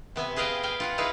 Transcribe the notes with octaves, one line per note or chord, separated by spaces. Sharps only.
C3 B3 E5 G#5
G#4 B4 D#5 F5 G5 G#5
F5 G5 G#5
F4 F#5 G#5
D#4 E4 G#4 B4 F5